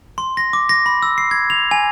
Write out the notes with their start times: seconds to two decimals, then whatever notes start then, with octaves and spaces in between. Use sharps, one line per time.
0.18 C6
0.37 A#6
0.53 D6
0.69 A#6
0.86 B5
1.03 E6
1.18 C7
1.31 G#6
1.50 F7
1.71 G#5